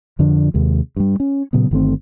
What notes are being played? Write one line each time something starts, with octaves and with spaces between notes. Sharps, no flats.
F2 D3 F3 D4
D#2 C3 G#3
G2 G3
C#4
A#2 C#3 F#3 B3
G1 D#3 A3 C4